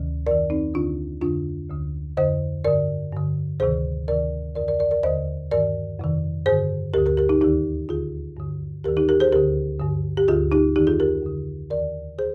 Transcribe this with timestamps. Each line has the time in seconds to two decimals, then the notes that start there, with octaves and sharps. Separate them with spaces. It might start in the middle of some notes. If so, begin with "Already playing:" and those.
Already playing: D2 C3 D#3
0.27 F2 D#3 A#4 D5
0.50 C4 D#4
0.74 D2 D3 D4 F4
1.21 F2 D3 D4 F4
1.70 D2 D3
2.17 F2 D3 C5 D#5
2.64 G2 D3 A#4 D5
3.12 G2 D3
3.60 D2 C3 D#3 G#4 C5
4.08 D2 C3 D#3 A#4 D5
4.55 F2 D3 A#4 D5
4.68 A#4 D5
4.79 A#4 D5
4.91 A#4 D5
5.03 D#2 D3 C5 D#5
5.51 G2 D#3 A#4 D5
5.99 F2 C3 D#3
6.46 G2 D3 G#4 C5
6.94 D2 D3 G4 A#4
7.06 G4 A#4
7.17 G4 A#4
7.29 D#4 G4
7.41 D#2 D#3 D#4 G4
7.89 D2 D3 F4 G#4
8.37 G2 D3
8.84 D#2 G4 A#4
8.88 D#3
8.97 D#4 G4
9.09 G4 A#4
9.20 G#4 C5
9.32 D2 D3 G4 A#4
9.80 G2 D3
10.17 G4
10.28 D2 D3 F4 G#4
10.52 D#4 G4
10.76 F2 D#3 D#4 G4
10.87 F4 G#4
11.00 G4 A#4
11.23 F2 D3
11.70 D#2 D#3 A#4 D5
12.19 G#4 C5